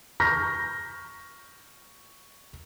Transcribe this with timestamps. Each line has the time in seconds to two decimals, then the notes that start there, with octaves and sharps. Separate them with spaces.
0.20 C#6 F6 G6 A#6 B6